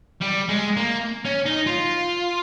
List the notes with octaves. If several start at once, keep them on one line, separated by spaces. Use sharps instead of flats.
G3
G#3
A#3
C#4
D#4
F4